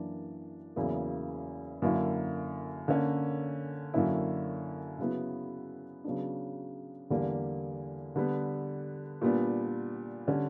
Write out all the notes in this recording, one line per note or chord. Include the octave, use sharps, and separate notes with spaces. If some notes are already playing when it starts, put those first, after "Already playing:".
Already playing: F#2 E3 A#3 D4
E2 C#3 F#3 A#3 E4
F#2 D3 A#3 E4
D3 A#3 C#4
F#2 D3 A#3 C#4 E4
C#3 F#3 B3 E4
C#3 F#3 B3 D4
E2 D3 G3 A#3
D3 G3 B3
A#2 G3 B3 D4
D3 G3 C#4